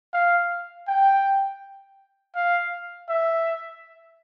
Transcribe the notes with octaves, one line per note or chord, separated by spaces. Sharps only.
F5
G5
F5
E5